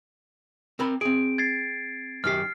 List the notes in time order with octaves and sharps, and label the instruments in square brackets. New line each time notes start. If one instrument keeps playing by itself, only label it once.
[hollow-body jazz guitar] C4 A#4 B5
[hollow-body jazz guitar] C4 G#4 [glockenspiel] D7
[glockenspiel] G#6 A6 C7
[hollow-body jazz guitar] F#2 D#3 G4 [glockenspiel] F6 C7